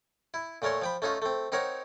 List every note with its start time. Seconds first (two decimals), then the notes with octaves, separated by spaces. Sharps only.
0.34 E4
0.62 A#2 A3 A#4 C#5 C6
0.82 F3 G5 B5
1.02 A3 C#4 D#4 F4
1.22 A3 C4
1.52 C4 D#4 A#4 C#5 F#5